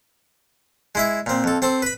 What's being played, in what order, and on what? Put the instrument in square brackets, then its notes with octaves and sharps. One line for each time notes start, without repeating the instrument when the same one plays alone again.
[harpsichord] G#3 E4 E5
A#2 C4
F2 A4
C4 A4 C5
B4 B5